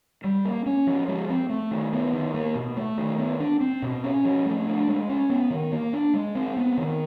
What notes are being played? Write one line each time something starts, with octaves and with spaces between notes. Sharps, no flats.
G3
A#3
C#4
F3
G#3
C4
A3
D#3
B3
D#3
A#3
B2
A3
D#3
B3
D4
C4
B2
C#4
F3
A3
D4
G#3
C#4
B3
D#3
A#3
D4
G#3
C4
B3
D#3